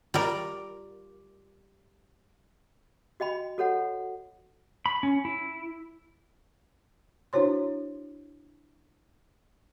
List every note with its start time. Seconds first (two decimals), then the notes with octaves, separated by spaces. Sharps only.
0.14 G3 F4 A#4 D5
3.20 F#4 D#5 G5 B5
3.58 F#4 A4 C#5 F#5
4.86 B5
5.03 C#4
5.25 E4
7.33 D4 E4 F#4 C5 C#5 C6